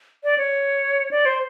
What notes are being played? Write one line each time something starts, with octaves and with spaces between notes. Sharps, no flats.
D5
C#5
D5
C5